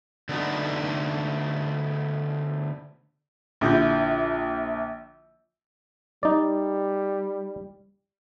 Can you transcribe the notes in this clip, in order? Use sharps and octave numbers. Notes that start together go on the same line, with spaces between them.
D3 A3 B3 D#4 F#4
A#1 D3 F3 E4 G6
G3 D#4 D5